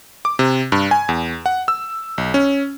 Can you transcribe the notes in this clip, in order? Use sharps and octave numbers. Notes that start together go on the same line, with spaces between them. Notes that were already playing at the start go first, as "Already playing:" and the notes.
D6
C3
G2
G#5
E2
F#5
E6
B1
C#4